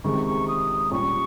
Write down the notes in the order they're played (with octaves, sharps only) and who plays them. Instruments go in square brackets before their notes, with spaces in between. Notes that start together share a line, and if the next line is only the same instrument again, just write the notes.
[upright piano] C#2 C3 D#3 G#3 [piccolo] C#6
[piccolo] C#6
D#6
[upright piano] A#2 G3 C#4 G4 [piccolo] C#6